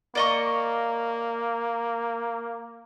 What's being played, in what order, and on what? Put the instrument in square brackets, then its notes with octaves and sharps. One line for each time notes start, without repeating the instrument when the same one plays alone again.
[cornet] A#3 [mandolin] D5 D#5 C#6